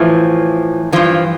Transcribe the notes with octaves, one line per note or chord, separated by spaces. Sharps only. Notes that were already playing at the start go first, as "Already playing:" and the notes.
Already playing: A2 E3 F3
G2 E3 F3